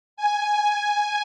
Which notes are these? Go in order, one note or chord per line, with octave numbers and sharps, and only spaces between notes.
G#5